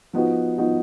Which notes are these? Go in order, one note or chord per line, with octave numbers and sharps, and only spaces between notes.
F3 B3 D#4 F#4
F3 B3 D#4 F#4